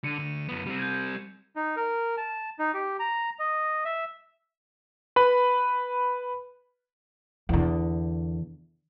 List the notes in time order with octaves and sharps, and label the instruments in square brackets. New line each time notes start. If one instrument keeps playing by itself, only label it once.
[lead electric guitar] D3 [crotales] C#7 D#7
[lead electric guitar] D2 D3
F#2 B3
G3 C4
[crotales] G6 G#6
[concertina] D#4
A#4
A5
D#4
G4
A#5
D#5
E5
[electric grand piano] B4 B5
[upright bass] E2 D3